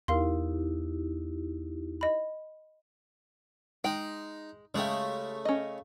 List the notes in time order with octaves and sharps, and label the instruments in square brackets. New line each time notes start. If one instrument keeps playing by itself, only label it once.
[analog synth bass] E2 [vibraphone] D#4 E4 G4 [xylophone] A#4 F5 C6
[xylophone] D#5 B5
[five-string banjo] G#3 G5 [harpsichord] D#4
[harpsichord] C#3 A3 [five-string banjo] G#3 G4
[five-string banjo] C#4 D#5